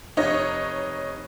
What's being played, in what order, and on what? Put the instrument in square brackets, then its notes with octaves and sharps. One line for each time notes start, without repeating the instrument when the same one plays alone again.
[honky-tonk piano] F1 D#4 C#5 D#5